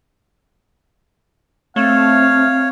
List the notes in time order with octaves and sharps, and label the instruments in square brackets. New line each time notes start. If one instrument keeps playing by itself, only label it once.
[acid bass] A3 [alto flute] C4 [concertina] C#5 [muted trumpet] F5